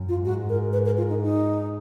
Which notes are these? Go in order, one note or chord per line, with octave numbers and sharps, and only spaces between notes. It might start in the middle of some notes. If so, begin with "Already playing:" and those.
Already playing: F#2
F4
G#2 F#4
A#4
B4
A#4
F4
D#4
D#4